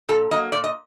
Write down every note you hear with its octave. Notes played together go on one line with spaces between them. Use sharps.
A#2 A4
F#3 A#3 D#5
A#2 D5
D#5